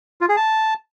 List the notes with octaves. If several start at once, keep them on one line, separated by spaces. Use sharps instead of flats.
F4
G#4
A5